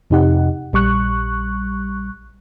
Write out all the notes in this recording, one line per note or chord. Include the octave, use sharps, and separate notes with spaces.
F2 C3 D#4 G4 F#5
A#1 G3 C#6 F#6